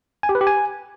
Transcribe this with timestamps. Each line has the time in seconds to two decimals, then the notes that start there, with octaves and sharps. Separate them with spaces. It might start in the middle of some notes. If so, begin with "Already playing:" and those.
0.23 G#5
0.29 G4
0.35 B4
0.41 G4
0.47 G#5